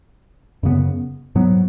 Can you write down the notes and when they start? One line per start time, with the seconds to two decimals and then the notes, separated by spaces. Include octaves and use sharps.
0.63 F#2 C#3 B3
1.35 G#2 F#3 B3